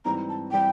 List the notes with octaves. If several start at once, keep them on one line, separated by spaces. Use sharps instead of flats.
G#2 E3 G3 C4 A#5
A5
E3 G3 C4 G5